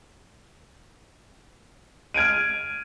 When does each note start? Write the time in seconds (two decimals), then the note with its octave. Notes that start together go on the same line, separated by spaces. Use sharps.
2.14 F6 G#6 D7 D#7